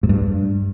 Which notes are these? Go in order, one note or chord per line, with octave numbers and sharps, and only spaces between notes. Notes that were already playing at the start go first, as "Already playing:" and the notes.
G#2
G2